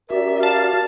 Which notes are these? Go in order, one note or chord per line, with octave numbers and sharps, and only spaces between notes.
C#4 F#4 G4 A#4 D5 E5
F5 A5